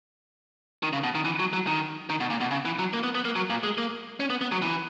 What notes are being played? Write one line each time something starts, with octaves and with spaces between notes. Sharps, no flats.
D#3
C#3
B2
D#3
E3
F#3
F#3
D#3
D#3
B2
A#2
B2
C#3
E3
F#3
A#3
B3
B3
A#3
F#3
A#2
G#3
A#3
C#4
B3
B3
F#3
E3